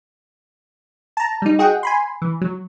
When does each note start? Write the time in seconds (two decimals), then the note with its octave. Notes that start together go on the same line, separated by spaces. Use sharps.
1.17 A5 A#5
1.42 G3 D#4
1.59 F#4 G#4 D#5 F#5 G5
1.83 G#5 B5 C6
2.22 E3
2.41 F#3